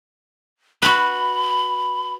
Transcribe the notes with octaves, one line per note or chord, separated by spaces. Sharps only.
F#4 B4 B5